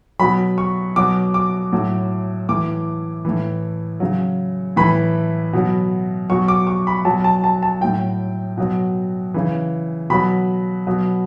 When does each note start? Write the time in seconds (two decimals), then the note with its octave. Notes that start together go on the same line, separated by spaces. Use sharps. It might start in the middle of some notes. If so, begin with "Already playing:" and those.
0.20 B2 F#3 B5
0.58 C#6
0.96 B2 F#3 D6
1.34 D6
1.72 A2 F#3
2.49 A2 E3 D6
3.25 A2 E3
4.00 C#3 F#3
4.76 A2 E3 B5
5.53 B2 F#3
6.29 B2 F#3 C#6
6.48 D6
6.67 C#6
6.87 B5
7.05 B2 F#3 A5
7.24 A5
7.44 A5
7.63 A5
7.81 A2 F#3 G5
8.57 B2 F#3
9.34 C#3 E3
10.10 B2 F#3 B5
10.87 B2 F#3